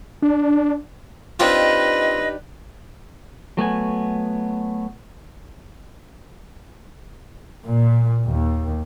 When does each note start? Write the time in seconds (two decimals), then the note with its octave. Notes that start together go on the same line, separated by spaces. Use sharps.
0.22 D4
1.40 C4 D4 D#4 F4 G4 B4 D#5
3.57 F#3 A3 B3 G#5
7.66 A#2
8.26 D#2